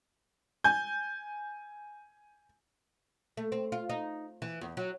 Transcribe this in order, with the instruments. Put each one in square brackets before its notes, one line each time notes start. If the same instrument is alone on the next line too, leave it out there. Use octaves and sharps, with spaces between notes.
[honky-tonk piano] G#5 G6
[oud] A3
C4
F4
D#4
E3
E2
F#3